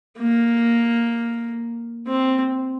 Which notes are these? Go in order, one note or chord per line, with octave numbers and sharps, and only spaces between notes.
A#3
C4